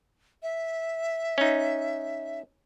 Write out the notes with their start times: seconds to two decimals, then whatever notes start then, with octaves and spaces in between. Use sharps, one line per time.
0.43 E5
1.38 C#4 D#4